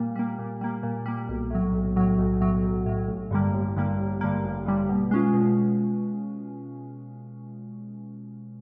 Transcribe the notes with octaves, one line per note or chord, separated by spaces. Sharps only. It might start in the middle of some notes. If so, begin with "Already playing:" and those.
Already playing: A#2 G3 A#3
G3 A#3
A#2
G3 A#3
A#2
G3 A#3
B1
A2 F#3
B1
A2 F#3
B1
A2 F#3
B1
A2 F#3
A1
G2 D3 G3 A#3
A1
G2 D3 G3 A#3
A1
G2 D3 G3 A#3
A1
G2 D3 G3 A#3
B2
G#3 C#4 F4
B2